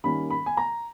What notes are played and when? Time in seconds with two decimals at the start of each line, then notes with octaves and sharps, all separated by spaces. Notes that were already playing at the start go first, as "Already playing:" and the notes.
0.04 D#3 G3 A#3 C#4 B5
0.30 B5
0.46 G#5
0.57 A#5